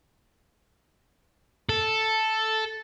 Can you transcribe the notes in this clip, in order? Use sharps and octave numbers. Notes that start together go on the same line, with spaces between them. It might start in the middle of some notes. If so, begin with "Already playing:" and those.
A4